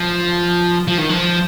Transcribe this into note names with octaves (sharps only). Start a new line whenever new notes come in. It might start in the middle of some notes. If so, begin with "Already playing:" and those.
Already playing: F3
F3
D#3
F3